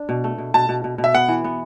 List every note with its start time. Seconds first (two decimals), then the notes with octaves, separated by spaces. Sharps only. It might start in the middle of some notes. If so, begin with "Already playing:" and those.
Already playing: D4
0.09 B2
0.24 A3
0.38 B2
0.54 B2 A5
0.69 B2
0.84 B2
0.98 B2
1.04 E5
1.14 B3 F#5
1.28 E3
1.44 B3